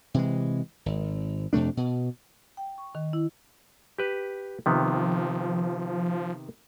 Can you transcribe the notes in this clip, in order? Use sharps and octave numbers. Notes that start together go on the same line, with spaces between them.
C3 E3 G#3
G#1
F2 C3 A3 D4
B2
G5
C#6
D#3
E4
G4 B4
C3 D#3 F3 B3